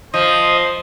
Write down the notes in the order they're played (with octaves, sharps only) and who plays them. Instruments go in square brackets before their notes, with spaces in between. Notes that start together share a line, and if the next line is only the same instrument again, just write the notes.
[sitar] F3 [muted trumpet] C5 [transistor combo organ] D#5